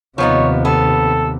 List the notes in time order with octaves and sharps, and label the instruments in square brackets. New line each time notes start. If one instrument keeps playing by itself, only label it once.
[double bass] D#2 C3 [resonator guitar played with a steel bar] F3 B3 D#4 [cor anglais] C#5
[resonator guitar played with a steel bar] B3 [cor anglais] A4